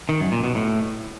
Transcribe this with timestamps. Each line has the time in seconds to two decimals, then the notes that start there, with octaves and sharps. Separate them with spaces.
0.09 D#3
0.20 F#2
0.32 A#2
0.44 B2
0.55 A2